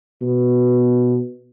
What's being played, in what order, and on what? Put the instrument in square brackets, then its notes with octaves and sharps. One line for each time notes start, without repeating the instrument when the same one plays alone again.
[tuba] B2